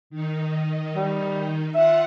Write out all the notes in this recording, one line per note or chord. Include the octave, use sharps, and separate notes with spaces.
D#3 D#4
G3
F4 E5 F#5